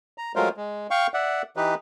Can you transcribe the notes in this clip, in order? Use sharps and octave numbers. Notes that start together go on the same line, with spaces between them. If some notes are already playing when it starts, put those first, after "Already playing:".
A#5
F#3 G#3 A3 F4 A#4 C5
G#3
F5 G5 C#6
D5 E5 F#5
E3 D#4 G4 B4